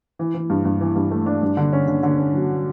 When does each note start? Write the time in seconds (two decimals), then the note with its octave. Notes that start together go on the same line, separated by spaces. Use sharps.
0.19 E3
0.34 E3
0.50 G2
0.65 G2
0.81 E3
0.96 G2
1.11 A3
1.26 D4
1.42 G2
1.57 D3
1.73 C#4
1.88 D3
2.03 D3
2.18 C#4
2.34 F#3